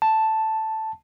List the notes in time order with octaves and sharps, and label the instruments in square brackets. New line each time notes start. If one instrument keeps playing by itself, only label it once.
[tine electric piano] A5